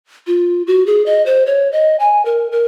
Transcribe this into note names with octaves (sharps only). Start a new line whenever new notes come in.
F4
F#4
G#4
D#5
C5
C#5
D#5
G#5
A#4
A#4